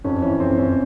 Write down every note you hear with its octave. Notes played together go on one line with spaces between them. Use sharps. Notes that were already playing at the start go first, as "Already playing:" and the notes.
F2 C#4
E3 C#4
F2 C4
F2 C#4